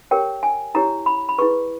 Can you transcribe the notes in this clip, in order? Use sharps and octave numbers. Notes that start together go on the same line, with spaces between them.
G4 A#4 C#5 G5
G#5
E4 G4 C#5 A#5
B5
B5
E4 G#4 B4 C#6